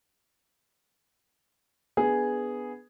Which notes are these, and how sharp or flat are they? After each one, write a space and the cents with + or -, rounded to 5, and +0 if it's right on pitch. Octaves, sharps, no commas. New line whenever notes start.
B3 +0 D4 +0 G#4 +0